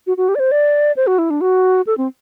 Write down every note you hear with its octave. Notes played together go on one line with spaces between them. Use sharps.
F#4
F#4
G4
D5
C5
D5
C5
F#4
E4
D4
F#4
A4
C4